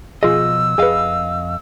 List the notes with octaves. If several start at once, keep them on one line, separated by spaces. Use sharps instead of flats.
B2 F3 F4 G#4 D#5 E6
F2 G#4 B4 D#5 F5